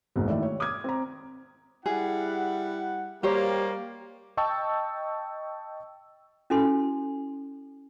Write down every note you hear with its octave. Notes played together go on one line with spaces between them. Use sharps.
F#1 B1 G#2
D#3 A3 E4 D5
C#5
D6 D#6 F6 G#6
C4 A#5
G3 E4 G#4 F#5
G3 A#3 G4 C5 C#5
D#5 G5 A5 C#6 E6
C#4 E4 F#4 A4 G#5 C6